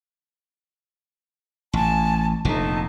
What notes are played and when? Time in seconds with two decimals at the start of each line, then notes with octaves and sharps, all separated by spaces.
1.73 A1 G#5 A5
2.45 F1 A#1 C3 D#4 A4 A5